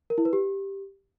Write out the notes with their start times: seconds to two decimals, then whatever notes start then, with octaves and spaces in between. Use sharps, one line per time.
0.10 A#4
0.18 E4
0.25 B4
0.33 G4